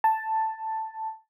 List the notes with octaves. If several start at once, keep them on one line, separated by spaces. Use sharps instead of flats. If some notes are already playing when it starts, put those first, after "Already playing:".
A5